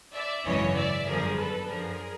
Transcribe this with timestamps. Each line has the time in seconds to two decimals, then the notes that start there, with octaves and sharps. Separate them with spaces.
0.14 D5 E5
0.45 G#1 F#2 C#3 E3 C#5 D#5
0.75 D5 E5
1.06 G1 F#2 D3 F3 G#4 A#4
1.37 A4 B4
1.68 F#2 D3 F3 G#4 A#4